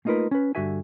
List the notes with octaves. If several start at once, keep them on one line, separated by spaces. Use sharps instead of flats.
A3 A#3 D#4 F4 A#4 B4
C#4 B4
G2 D3 D4 F#4 E5 G#5